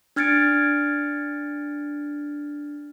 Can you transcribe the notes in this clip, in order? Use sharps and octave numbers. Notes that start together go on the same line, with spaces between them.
D4 F6 G#6 A6 C#7 D7